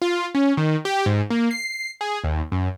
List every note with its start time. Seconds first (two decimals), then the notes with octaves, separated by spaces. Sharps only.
0.02 F4
0.35 C#4
0.57 D#3
0.85 G4
1.06 G#2
1.30 A#3
1.51 C7
2.01 G#4
2.24 D#2
2.52 F#2